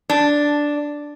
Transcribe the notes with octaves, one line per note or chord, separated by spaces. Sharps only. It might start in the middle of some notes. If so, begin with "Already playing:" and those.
D4